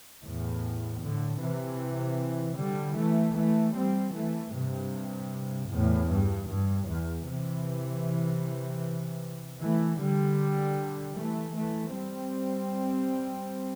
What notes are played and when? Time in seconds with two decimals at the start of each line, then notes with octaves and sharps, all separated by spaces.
0.23 E2 A2
1.01 A2 D3
1.41 C3 E3
2.58 D3 G3
2.96 E3 A3
3.35 E3 A3
3.74 G3 C4
4.14 E3 A3
4.53 G2 C3
5.69 E2 A2
6.09 G2
6.48 G2
6.87 E2
7.26 C3 E3
9.61 E3 A3
9.99 D3 G3
11.17 E3 A3
11.55 E3 A3
11.95 G3 C4